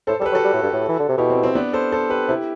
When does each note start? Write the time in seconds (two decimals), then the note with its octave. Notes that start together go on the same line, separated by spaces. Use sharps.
0.07 A2 A4 C5
0.20 G3 A4
0.26 G4 B4
0.32 F#3
0.35 F#4 A4
0.45 G3
0.54 A2
0.63 G2
0.73 A2
0.89 E3
0.99 D3
1.09 C3
1.18 B2 E4 G4
1.30 C4
1.43 C4
1.55 B3 D4
1.73 A4 C5
1.92 A4 C5
2.10 G4 B4
2.28 C3 E4 G4